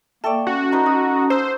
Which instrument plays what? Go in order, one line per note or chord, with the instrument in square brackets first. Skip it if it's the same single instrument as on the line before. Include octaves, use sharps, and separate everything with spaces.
[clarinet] A#3 [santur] A4 D5 [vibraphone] E5 G5 C#6
[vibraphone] C#4 [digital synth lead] F#4
[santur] D#4 B4 D#5 [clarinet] A#5
[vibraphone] C#4 D#6
[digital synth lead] C5 [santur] E6